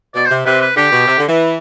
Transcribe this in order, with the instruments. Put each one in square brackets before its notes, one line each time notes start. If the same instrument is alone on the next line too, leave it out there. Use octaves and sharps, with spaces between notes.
[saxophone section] B2 [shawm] D5
[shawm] C5
[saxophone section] C3
[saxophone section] C3 [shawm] B4
[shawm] B4
[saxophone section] D3 [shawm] G4
[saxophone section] B2
C3
D3
E3